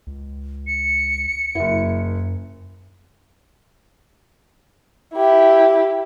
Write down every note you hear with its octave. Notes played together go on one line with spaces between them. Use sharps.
C#2
C#7
F#1 F#2 E4
E4 G4